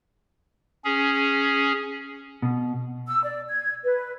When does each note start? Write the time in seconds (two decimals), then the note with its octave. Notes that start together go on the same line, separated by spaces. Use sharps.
0.85 C#4 G#4
2.42 B2
3.07 E6
3.23 D5
3.49 G#6
3.84 B4